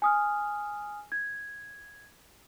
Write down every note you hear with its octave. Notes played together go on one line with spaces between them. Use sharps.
G#5 D#6 F6
G#6